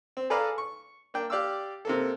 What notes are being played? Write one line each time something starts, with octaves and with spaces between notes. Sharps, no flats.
C4
G#4 A4 B4 D5 F5 A#5
C#6
A#3 D4 G5
G4 D5 F5 D6 E6
C3 A#3 A4